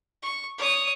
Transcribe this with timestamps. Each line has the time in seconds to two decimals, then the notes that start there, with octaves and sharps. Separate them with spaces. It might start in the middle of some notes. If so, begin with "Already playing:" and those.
0.22 C#6
0.58 C#5 D#6